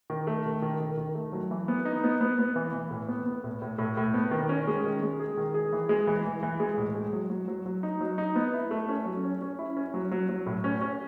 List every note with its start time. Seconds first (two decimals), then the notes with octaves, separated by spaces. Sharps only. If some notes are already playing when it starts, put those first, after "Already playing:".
0.10 D#3
0.27 A3
0.46 D#3
0.62 D#3
0.80 D#3
0.97 D#3
1.15 A3
1.32 F#3
1.51 E3
1.68 B3
1.85 D#4
2.03 B3
2.21 B3
2.39 B3
2.56 E3
2.74 E3
2.91 A2
3.09 B3
3.26 B3
3.44 A2
3.62 A2
3.78 A2
3.97 A2
4.14 B3
4.31 D#3
4.49 C#4
4.67 G#3
4.84 D#3
5.02 G#3
5.20 G#4
5.37 D#3
5.54 G#4
5.72 E3
5.89 G#3
6.07 E3
6.25 E3
6.43 E3
6.60 G#3
6.77 A2
6.95 G#3
7.13 F#3
7.30 F#3
7.48 F#3
7.66 F#3
7.83 D#4
8.01 F#3
8.18 D#4
8.36 B3
8.54 E4
8.71 A3
8.89 C#4
9.05 F#3
9.23 C#4
9.41 C#4
9.59 E4
9.77 C#4
9.94 F#3
10.11 F#3
10.29 F#3
10.46 A2
10.64 C#4
10.81 C#4